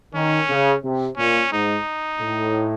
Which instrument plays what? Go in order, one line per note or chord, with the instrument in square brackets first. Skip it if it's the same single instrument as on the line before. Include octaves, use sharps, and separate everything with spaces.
[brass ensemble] D#3 [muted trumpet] C#4
[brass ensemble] C#3
C3
[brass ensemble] A#2 [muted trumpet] C#4
[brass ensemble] G#2 [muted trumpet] D#4
[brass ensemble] A2